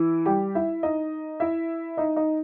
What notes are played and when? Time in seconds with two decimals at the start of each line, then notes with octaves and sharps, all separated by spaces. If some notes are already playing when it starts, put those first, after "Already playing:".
Already playing: E3 E4
0.26 G3 G4
0.55 E4 E5
0.83 D#4 D#5
1.40 E4 E5
1.97 D#4 D#5
2.16 D#4 D#5